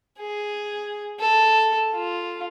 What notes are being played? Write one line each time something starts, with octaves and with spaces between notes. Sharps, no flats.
G#4
A4
F4